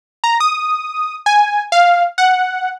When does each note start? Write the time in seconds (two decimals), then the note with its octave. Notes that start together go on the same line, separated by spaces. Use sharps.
0.24 A#5
0.40 D#6
1.26 G#5
1.72 F5
2.18 F#5